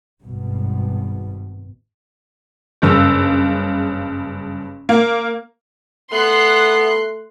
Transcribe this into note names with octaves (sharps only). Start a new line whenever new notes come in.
G#1 G2 B2
F#1 G2 C#3 E6
A#3
A3 B3 C6 F#6 C7